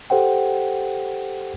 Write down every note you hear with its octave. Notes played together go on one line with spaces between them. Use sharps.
G4 A4 C5 F#5 G5